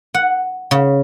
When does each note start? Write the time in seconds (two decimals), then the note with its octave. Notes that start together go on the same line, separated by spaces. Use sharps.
0.14 F#5
0.71 C#3